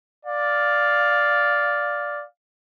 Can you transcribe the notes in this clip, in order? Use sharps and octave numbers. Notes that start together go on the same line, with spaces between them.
D5 F5